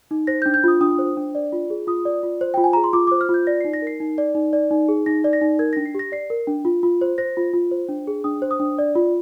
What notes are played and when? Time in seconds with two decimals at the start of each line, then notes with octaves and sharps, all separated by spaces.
0.11 D#4
0.27 C5 A#6
0.42 G6
0.46 D4
0.54 G6
0.64 F4 D#6
0.81 D4 D#6
0.99 C5
1.17 D4
1.35 D5
1.52 F4
1.70 G#4
1.87 F4 D#6
2.05 D5
2.23 F4
2.41 C5
2.54 F4 G5
2.64 G#5
2.73 G#4 A#5
2.84 C6
2.93 F4 D6
3.07 D6
3.11 C5
3.21 F6
3.29 F4
3.34 G6
3.47 D5 A#6
3.61 C7
3.65 D#4
3.73 A#6
3.82 A#4 C7
4.00 D#4
4.18 D5
4.35 D#4
4.53 D5
4.71 D#4
4.89 G#4
5.06 D#4 A#6
5.24 D5
5.33 A#6
5.41 D#4
5.59 A#4 G#6
5.73 A#6
5.77 D4
5.86 C7
5.95 G4 A#6
6.12 D5 C7
6.30 A#4
6.47 D4
6.65 F4
6.83 F4
7.01 C5
7.18 C5 A#6
7.37 F4
7.54 F4
7.71 C5
7.89 D4
8.07 G#4
8.24 D4 D#6
8.42 C5
8.51 D#6
8.60 D4
8.78 D5
8.96 F4